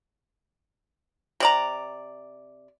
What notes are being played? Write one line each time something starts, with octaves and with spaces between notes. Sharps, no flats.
C3 D5 A#5